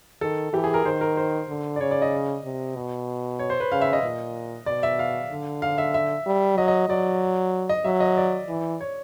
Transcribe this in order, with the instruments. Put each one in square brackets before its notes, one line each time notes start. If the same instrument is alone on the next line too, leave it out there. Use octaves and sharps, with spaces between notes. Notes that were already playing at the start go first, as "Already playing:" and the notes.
[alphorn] D#3 [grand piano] A4
[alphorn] E3 [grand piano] G4
[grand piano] G#4
A#4
[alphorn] D#3 [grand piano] C5
[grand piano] A#4
C5
[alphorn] D3
[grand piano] D5
[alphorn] C#3 [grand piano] C#5
[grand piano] D5
D#5
[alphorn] C3
B2
[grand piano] C#5
C5
B4
[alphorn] C#3 [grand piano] F5
[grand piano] E5
D#5
[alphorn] A#2
[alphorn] B2 [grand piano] D5
[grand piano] E5
F5
[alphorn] D3
[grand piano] F5
E5
E5
[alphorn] G3
[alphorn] F#3 [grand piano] D#5
[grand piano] D#5
[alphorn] F#3 [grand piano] D5
[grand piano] D#5
[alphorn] F#3 [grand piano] E5
[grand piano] D#5
D5
[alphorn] E3
[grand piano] C#5